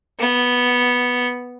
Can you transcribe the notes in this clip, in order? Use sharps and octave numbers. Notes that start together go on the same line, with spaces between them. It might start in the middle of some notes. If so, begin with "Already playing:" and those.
B3